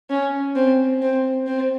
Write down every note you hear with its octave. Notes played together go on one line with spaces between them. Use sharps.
C#4
C4
C4
C4